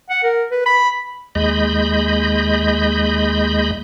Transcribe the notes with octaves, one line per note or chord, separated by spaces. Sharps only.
F#5
A#4
B4
B5
D#2 G#3 D#5 B5 G6